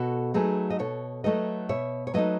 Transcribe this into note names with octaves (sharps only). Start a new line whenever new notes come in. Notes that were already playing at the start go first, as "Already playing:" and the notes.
Already playing: B2 F#4 A4
F#3 A3 D#4 G#4 B4
D#5
B2 A4 C#5
F#3 A3 D#4 B4 D#5
B2 C#5 E5
C#5
F#3 A3 D#4 B4 D#5